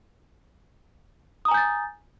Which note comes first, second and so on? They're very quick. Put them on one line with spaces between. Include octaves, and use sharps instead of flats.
D#6 A#5 G#5 G6 A6